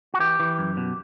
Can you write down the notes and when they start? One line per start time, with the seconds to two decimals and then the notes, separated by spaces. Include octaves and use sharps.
0.14 F#4
0.20 E3 G4
0.40 E3
0.59 F#2
0.77 B2